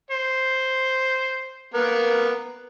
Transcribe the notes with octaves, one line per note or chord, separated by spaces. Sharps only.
C5
A#3 B3 A#4